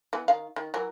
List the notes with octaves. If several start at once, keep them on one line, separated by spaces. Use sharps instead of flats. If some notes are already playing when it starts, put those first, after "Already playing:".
E3 B3
D#3 F5
D#3
E3 F#3 A#4